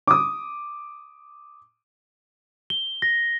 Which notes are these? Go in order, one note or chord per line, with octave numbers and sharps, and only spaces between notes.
D6 D#6
G7
A#6